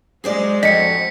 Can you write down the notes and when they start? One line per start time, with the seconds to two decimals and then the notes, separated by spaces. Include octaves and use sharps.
0.24 F#3 G#3 G#4 C5 D5
0.63 F2 F#4 D#5 B6 C#7